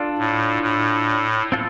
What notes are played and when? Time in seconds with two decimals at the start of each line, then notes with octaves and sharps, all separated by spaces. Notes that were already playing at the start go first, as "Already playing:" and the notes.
Already playing: D4 F4 A4 D5
0.19 A2
0.62 A2
1.52 C4 F4 A4